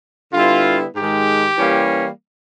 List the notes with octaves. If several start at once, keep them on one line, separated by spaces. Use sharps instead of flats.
D3 G3 B3 E4 F4
G#2 D#3 G#3 G4
E3 G3 A#3 C#4